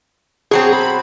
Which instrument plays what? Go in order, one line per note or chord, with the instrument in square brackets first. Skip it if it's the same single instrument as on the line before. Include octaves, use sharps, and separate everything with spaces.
[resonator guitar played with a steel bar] B2 F#3 C4 [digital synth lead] G#4
[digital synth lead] B5